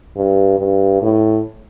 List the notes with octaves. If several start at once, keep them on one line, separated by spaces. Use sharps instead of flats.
G2
G2
A2